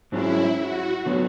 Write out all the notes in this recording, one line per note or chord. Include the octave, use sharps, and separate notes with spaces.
G#2 F#3 C#4 E4 G#4
F#4
D3 F#3 B3